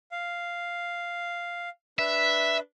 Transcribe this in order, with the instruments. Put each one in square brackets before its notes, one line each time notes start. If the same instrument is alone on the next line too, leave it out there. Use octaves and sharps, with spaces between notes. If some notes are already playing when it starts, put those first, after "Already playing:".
[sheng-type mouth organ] F5
[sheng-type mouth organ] D4 B4 [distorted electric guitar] E5